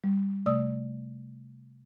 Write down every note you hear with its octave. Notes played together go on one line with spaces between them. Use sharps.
G3
C3 A3 D5 D#6 E6